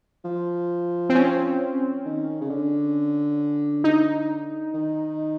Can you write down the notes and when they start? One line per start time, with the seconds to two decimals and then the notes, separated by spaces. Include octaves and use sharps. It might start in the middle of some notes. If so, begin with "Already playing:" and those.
0.25 F3
1.10 C4
1.15 C#4
2.05 D#3
2.41 C#3
2.50 D3
3.84 D#4
4.74 D#3